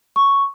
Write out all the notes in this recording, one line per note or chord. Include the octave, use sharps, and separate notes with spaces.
C#6